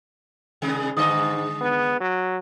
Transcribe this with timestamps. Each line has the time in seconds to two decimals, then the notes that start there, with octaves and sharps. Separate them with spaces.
0.62 C3 D#3 G#3
0.97 G#2 D3 G#3 D#5
1.61 B3
2.01 F#3